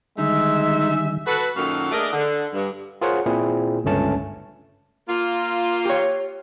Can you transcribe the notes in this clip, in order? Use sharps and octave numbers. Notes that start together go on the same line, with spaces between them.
D3 D#3 G3 G#3 D#4 E5
F#4 A4 B4
F#2 A#2 D#3 F#4 A4 F5
A3 D4 G#4 A#4 D5 D#5
D3
G2
F4 G#4 A#4 C5 C#5 F#5
A#2 C4 E4 G#4
G1 C#2 G2 A3 C#4 A5
A#3 F4
G4 C#5